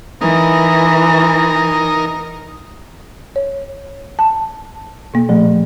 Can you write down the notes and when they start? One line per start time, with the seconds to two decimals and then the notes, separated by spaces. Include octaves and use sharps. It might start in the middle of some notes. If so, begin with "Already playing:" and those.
0.21 E3 D#4 A#4
3.36 C#5
4.19 A5
5.14 B2 A#3
5.29 A#2 F3 A3